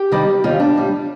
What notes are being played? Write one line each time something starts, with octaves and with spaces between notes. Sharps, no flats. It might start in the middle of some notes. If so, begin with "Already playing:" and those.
Already playing: G4
F2 D#3 G3
D#2 D#3 G3 F4
D4
A2 G3